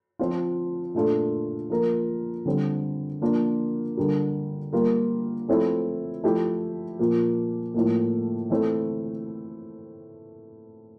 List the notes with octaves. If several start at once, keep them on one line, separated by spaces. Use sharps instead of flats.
F3 C4 F4
A#2 A3 D4 F4 A4
F3 A#3 F4 A#4
D3 G3 C4
F3 A#3 D4 F4 A#4
D3 G3 D4 G4 A#4
G3 A#3 F4 A#4
F3 A3 C4 E4 A4
F3 A3 E4 G4
A#2 F3 A#3
A2 F3 A#3
E3 A3 C4